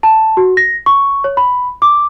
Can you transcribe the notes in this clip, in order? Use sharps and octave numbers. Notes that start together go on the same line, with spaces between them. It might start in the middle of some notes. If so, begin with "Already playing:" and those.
A5
F#4
A#6
C#6
C#5
B5
D6